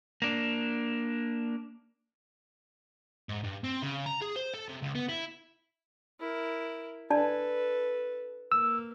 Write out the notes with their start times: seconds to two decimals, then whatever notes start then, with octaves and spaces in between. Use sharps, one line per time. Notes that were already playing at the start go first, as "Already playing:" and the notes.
0.22 A#3 D4
3.29 G#2
3.44 G2
3.64 C4
3.82 C#3
4.06 A#5
4.21 G#4
4.36 C5
4.54 A4
4.69 C3
4.83 C#2
4.95 B3
5.09 E4
6.20 E4 A#4
7.10 D4 A4 B4 D5 A5
8.52 A#3 E6